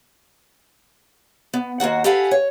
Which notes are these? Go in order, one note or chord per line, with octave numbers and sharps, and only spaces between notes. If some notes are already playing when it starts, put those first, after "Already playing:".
B3
D#2 A#3 F#4 F#5
G4 A4 B4 F5 F#5 G#5
C#5